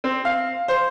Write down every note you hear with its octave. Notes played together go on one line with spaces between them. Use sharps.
C4
F5
C5